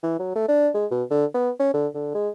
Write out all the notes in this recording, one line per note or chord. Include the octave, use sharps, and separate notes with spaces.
E3
F#3
A3
D4
G#3
B2
D3
B3
C#4
D3
D3
G#3